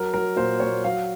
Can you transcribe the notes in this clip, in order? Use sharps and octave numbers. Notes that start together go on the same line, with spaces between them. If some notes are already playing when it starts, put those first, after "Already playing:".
Already playing: F#3 A#4
F#3 A#4
A#2 C5
A#2 C#5
F#3 F5